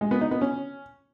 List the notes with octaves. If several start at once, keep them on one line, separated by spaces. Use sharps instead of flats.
G#3
B3
D#4
B3
C#4